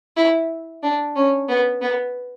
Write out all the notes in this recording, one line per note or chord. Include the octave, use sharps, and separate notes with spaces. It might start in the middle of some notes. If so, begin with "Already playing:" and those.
E4
D4
C#4
B3
B3